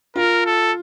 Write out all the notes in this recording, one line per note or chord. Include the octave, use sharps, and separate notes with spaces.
F4 A#4
A4